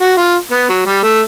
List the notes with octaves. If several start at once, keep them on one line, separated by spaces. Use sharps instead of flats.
F#4
F4
B3
F#3
G3
A3